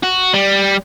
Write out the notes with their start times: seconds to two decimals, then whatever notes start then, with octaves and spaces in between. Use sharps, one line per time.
0.03 F#4
0.33 G3